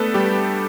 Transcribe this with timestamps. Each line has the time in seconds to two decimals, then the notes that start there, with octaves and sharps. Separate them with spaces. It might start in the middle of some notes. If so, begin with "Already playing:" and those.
Already playing: A3 B3 D4 A4 B4
0.14 G3 G4